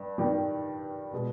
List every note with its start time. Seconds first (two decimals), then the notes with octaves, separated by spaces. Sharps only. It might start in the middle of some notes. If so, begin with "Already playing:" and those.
Already playing: G2
0.18 G2 D#3 G3
1.13 B2 G#3